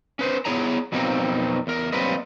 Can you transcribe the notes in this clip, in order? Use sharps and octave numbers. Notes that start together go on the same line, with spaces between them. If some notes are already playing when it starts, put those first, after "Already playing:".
C#4 B4 C5
B3 E4 G#4 C#5 G#5 A#5
F2 B2 F#3 A#3 C4 D#4
E2 A#4
F#3 G3 A#3 C4 B4 D#5